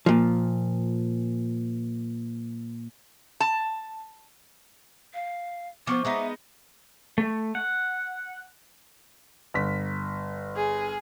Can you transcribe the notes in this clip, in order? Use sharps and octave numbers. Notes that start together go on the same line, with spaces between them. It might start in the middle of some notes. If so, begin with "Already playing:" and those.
A#2 F3
A5
F5
F3 B3 C5 C#6 D6
G#3 B3 D#4 E5
A3
F#5
G1 B6
G#4